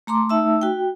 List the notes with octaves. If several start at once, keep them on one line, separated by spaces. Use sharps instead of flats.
A3 A#5 C6 D6
A3 D#4 E5 A5 E6
F#4 G5